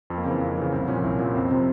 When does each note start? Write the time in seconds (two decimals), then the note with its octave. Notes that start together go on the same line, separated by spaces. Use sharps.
0.10 F2 C4
0.18 A#3
0.24 C#3 C4
0.31 E3
0.41 F2
0.57 C#3 E3
0.73 C2 C4
0.88 A#2 F3 C#4
1.04 C2 E4
1.19 A#2 F3
1.35 F2 C4
1.51 C3 F3 C4